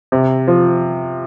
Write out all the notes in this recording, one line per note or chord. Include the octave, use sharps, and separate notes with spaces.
C3
F3